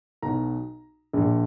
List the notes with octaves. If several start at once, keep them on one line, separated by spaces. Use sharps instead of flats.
B1 B2 A#5
A#1 A#2